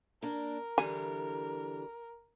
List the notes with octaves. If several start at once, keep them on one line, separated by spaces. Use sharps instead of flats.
A#3 D4 A#4
D3 E3 G3 G#5